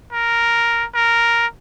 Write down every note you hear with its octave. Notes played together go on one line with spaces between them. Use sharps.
A#4
A#4